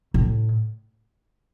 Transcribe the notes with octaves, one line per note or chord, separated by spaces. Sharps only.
A2